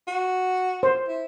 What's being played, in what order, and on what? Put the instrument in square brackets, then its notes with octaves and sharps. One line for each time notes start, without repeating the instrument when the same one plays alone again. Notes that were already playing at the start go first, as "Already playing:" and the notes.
[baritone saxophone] F#4
[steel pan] C5
[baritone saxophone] E4